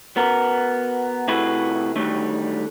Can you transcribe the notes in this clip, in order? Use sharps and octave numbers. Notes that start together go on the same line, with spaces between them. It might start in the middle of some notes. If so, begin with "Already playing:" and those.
B3 F#4 A#4
C3 A3 E4 F#4 G#4 B4
D3 D#3 F#3 G3 A3